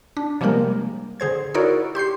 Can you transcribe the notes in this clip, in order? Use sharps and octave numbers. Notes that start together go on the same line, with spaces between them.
D4
C3 F3 G3 G#3 A#3 A#4
D3 G#4 C5 G#6
D#4 E4 F#4 A#4 C#5 D5
G4 C6 G6 C7